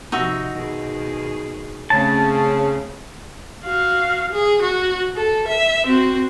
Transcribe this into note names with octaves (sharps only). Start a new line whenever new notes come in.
C3 F3 D#4 F#4 E5
B2 D#3 G#4
C#3 A3 C4 C#4 A5
F#4 F5
G#4
F#4
A4
E5
C4 F#4